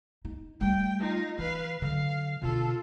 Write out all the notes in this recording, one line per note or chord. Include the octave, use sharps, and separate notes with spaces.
D#4
G3 A3 G5
D#4 F4
E3 B4 F5
D3 F#3 F5
B2 D3 F4 A4